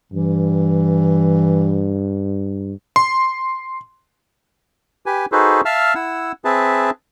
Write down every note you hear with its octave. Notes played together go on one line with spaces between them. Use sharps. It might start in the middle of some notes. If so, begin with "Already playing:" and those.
G2 E3
C6
G4 B4 G#5
D#4 F#4 G#4 A4 B4 C5
E5 F5 A5 E6 F6
E4 F#5 E6
C4 G#4 B4 E5 A5